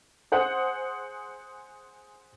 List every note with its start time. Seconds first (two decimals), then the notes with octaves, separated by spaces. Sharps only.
0.32 G#4 C5 F#5